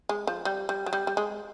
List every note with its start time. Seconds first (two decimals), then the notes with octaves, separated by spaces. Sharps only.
0.09 G#3
0.27 F3
0.45 G3
0.69 G3
0.86 F#3
0.93 G3
1.07 G3
1.17 G#3